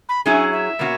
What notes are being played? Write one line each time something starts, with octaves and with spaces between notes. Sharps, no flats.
B5
F#3 C#4 E4 G#4 G#5
E5
B2 A#3 C#4 F#4